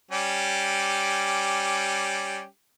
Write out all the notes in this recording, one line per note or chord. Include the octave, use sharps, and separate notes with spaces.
G3 C#4 G4